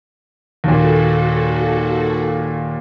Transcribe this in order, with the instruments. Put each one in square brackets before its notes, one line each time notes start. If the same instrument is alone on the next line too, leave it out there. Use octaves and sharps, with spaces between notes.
[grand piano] D#2 A#2 [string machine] F#4 A4